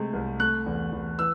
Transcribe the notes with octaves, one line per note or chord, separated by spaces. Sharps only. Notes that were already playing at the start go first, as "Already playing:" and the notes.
Already playing: C3 G#3 A3
C2
A3 F#6
E2
E2
E3 E6